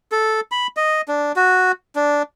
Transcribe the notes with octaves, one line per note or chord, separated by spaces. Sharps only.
A4
B5
D#5
D4
F#4
D4